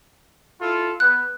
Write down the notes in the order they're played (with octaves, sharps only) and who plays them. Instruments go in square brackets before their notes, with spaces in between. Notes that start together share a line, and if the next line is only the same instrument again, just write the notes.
[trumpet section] E4 F4 A4
[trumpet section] B3 [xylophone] F#6